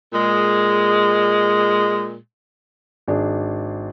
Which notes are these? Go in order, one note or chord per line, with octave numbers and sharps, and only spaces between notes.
A#2 G#3
G#1 D4 G#4